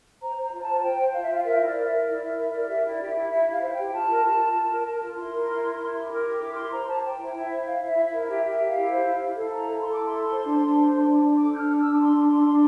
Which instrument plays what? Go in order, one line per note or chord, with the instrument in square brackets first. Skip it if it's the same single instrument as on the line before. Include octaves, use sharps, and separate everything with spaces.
[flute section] C5 A#5
C5 A#5
F4
A5
C5
C5 G5
C5
F4 F5
E5
F4 F5
A#4 E5
E4
D5
A#4
E5
A#4
E4 D5
E4 E5
A#4 E5
A#4 D5
G4 E5
E4 D5
G4
E4 E5
E4 E5
E4
F5
C5
G5
G4
F4 A5
A#4
F4
F4
F4
A#4
A#4
F4
E4 C6
A#4
E4
E4
E4
G4
A#4
G4
E4 D6
E4 C6
C5 A#5
C5 A5
C5 G5
E4
G5
E4
C5 E5
E4 F5
E4
E5
E4
A#4 E5
G4 E5
G4
E5
G4
F5
E4
C5
E4
E4
A4
E4 A#5
A4
A4 C6
E4 D6
C6
A4
C5
D4
D4
C5
D4
D4
D4
A4 D6
D4 G6
F6
D4
D4 E6
D6
D4 C6
D4
D4 C6
D4